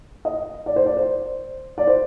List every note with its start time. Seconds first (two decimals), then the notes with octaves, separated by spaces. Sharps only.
0.25 D#5
0.66 D5
0.76 C5
0.86 D5
0.97 C5
1.78 D5
1.87 C5